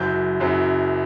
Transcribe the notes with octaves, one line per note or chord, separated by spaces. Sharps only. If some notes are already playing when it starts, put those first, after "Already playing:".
Already playing: F#1 F#2 F#3 G6
F#1 F#2 F#3